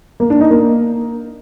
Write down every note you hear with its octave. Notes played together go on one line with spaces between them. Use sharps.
A#3
D4
D#4
A#3